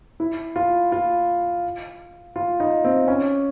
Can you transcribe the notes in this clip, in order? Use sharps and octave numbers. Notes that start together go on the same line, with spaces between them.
E4
F4
F4
F4
D#4
C4
C#4